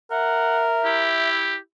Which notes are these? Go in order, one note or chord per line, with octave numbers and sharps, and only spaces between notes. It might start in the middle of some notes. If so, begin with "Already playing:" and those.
A#4 E5 F#5
E4 G4